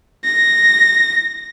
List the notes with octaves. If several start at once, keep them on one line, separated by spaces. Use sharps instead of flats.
A#6